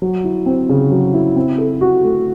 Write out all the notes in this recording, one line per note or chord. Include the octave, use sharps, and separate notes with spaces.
F#3
E4
C4
C#3
F#3
E4
C4
A4
F#4
A3